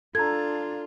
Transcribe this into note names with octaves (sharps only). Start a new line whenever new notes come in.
D4 F4 A4 A#5 G#6